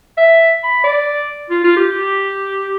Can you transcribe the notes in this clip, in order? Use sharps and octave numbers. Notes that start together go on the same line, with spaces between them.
E5
B5
D5
F4
F4
G4